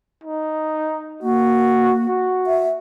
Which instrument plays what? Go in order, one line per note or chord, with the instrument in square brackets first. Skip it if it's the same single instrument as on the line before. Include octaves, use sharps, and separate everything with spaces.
[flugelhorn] D#4
[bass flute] A#3 [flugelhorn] F#4
[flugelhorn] F#4
[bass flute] E5